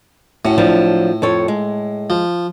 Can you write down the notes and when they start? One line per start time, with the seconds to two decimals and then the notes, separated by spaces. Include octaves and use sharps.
0.45 A2 C#4 F#4
0.58 F3 F#3 D4
1.22 F2 A4 C#5
1.48 G#3
2.10 F3